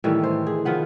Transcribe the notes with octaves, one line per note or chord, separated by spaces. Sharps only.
A2 D#3 E3 G3
C5
G#4
D#3 F3 B3 F#5